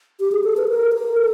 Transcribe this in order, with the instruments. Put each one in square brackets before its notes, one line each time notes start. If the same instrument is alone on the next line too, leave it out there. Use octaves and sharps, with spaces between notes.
[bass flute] G4
G#4
A4
B4
A#4
A#4
A4